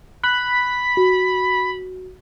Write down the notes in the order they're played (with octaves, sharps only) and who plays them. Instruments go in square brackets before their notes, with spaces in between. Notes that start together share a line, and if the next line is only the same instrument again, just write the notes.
[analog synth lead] B5 [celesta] F#6
[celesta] F#4